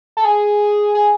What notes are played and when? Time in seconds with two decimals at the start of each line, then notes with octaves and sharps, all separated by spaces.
0.17 A4
0.25 G#4
0.95 G#4